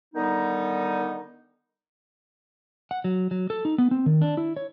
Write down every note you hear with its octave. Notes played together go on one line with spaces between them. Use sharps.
D3 D#3 G3 B3 D#4
F#5
F#3
F#3
A4
D#4
B3
C4
D#3
D4
E4
C#5